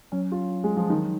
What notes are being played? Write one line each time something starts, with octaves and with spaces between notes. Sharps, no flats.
F#3 C#4
F4
G#3
F3
D#3